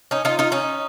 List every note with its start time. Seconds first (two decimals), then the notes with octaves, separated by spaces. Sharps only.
0.11 C#4 D#4
0.25 D#4 F4
0.39 D#4 F4
0.52 C#4 D#4